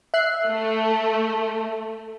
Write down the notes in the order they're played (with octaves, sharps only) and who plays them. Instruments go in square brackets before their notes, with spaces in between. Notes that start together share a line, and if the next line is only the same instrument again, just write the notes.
[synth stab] E5 F#6 C7
[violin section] A3